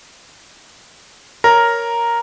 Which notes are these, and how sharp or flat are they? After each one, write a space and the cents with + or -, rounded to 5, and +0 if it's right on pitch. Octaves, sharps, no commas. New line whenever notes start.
A#4 +0 C#5 +5 A#5 +0